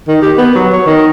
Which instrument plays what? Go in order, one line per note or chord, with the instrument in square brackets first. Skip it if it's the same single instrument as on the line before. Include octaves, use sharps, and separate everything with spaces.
[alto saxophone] D#3
G4
B3
F#3
C#5
D#3